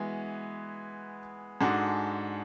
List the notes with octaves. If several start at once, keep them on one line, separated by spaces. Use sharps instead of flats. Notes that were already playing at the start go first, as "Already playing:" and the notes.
Already playing: E3 G#3 B3 F#4
G#2 G#3 D4 F#4 A4